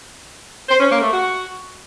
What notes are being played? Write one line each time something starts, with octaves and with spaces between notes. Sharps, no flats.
C5
C#4
A#3
A3
F#4